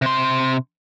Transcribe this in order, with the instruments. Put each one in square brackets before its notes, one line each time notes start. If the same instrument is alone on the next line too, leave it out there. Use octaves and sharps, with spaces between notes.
[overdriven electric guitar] C3 C6